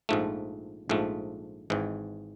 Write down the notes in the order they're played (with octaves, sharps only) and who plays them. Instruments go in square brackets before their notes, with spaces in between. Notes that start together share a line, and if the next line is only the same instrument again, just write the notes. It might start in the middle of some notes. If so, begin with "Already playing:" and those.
[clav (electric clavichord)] A#1 G#2 F3 A3
A#1 G#2 F3 A3
G#1 G#2 E3